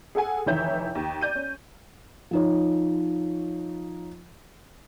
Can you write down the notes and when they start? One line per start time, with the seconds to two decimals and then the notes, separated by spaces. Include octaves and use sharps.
0.15 G#4 A4 F#5 G#5
0.46 F1 D#3 E3 C#5 E5 G6
0.95 D#2
1.21 D5 G6 D#7
1.35 C#4
2.31 F3 D#4 C#5